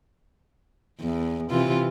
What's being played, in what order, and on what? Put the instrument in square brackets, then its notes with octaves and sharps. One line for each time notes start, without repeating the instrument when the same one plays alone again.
[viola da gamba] E2
C3 E3 F4